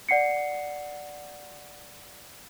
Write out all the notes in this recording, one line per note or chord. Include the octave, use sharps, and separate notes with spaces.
D5 F#5 C7 C#7